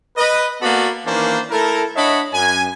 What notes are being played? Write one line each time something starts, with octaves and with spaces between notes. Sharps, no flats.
B4 D#5
A#3 B3 F#4 A4 D5 B5
D#3 E3 A#3 C#4 D4 C5
A3 E4 A4 A#4
D4 C#5 D#5 E5 F#5 B5
F#2 G#5